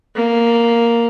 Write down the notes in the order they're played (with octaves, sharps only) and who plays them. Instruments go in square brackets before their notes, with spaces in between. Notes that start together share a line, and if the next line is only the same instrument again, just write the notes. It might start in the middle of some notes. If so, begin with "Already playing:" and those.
[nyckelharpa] A#3